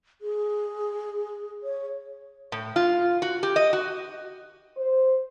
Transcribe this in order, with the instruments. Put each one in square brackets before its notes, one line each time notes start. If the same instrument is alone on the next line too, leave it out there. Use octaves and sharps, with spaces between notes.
[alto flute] G#4
C#5
[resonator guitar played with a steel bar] A2
F4
F#4
G4
D#5
F#4
[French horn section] C5